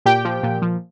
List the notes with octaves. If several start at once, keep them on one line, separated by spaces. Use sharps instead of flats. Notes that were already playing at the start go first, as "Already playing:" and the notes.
A#2 G4 G5
F3
A#2
F3